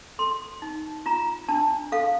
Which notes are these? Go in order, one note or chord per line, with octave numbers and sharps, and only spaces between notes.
A4 C6
D#4
F4 A#5
D4 A5
A4 F5